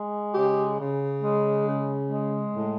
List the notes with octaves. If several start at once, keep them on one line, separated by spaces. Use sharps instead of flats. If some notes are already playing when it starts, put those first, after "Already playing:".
Already playing: G#3
C#3 G4
C#3
G#3
C#3
G#3
A2